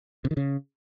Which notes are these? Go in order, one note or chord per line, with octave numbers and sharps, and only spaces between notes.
C3
D#3
C#3